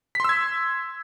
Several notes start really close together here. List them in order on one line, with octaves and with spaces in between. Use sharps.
B6 C6 E6 G#6